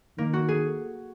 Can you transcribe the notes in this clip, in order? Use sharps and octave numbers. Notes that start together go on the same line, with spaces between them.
D#3 A#3
F#4
G#4